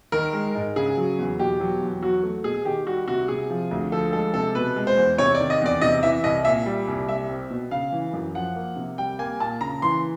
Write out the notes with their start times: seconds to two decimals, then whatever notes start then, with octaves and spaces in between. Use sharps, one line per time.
0.12 D#3 A#4
0.33 G#3
0.55 G#2
0.76 C#3 G#4
0.97 F#3
1.19 E2
1.39 B2 G4
1.60 F#3
1.81 E2
2.02 F#3 F#4
2.23 A3
2.44 B2 G#4
2.65 D#3 G4
2.87 G3 F#4
3.08 C3 F#4
3.28 C3 G#4
3.50 F3
3.71 D2
3.92 F3 A4
4.13 G#3 A4
4.34 C3 A4
4.55 B2 B4
4.76 G#3
4.87 C5
4.97 E2
5.18 C3 C#5
5.35 D5
5.40 D#3
5.50 D#5
5.61 E2 D5
5.81 C3 D#5
6.03 E3 E5
6.24 C2 D#5
6.45 A#2 E5
6.66 G3
6.87 C2
7.08 G3 E5
7.29 C4
7.50 B2
7.71 C#3 F5
7.92 E3
8.13 F#2
8.34 F3 F#5
8.56 A#3
8.76 C3
8.98 G3 G5
9.19 A#3 G#5
9.40 A#2 A5
9.61 C#3 A#5
9.82 E3 C6